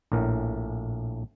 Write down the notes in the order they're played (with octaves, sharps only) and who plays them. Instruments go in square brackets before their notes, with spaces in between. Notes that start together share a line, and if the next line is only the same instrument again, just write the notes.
[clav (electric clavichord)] A#1 A2 A#4